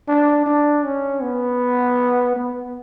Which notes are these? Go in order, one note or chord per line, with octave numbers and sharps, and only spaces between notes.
D4
D4
C#4
B3
B3